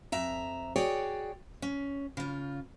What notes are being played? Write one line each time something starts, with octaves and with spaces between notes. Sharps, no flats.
F2 E5 A#5
F#4 G#4 C#5 D5 G5
C#4
C#3 F4